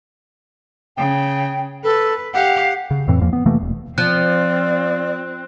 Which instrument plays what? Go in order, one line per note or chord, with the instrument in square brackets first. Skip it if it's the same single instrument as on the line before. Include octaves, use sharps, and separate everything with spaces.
[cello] C#3 [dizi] G5
[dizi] A4 [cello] B4
[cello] G4 F5 [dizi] F#5
[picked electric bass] C#3
F2 A2 E3 C4
E2 F3 A#3
B3
C3 E3 A3 A#3
E1
[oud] F3 [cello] C4 [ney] D5 [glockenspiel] F#6